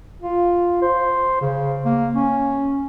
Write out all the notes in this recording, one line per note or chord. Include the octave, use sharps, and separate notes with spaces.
F4
C5
C#3
A#3
C#4